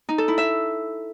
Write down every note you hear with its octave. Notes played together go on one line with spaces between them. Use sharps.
D#4
A4
E4
E5